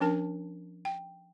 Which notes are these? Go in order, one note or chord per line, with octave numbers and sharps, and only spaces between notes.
F3 C#4 D4 A#4 A5
G5